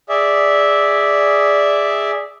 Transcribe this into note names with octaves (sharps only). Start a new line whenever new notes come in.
G#4 D5 E5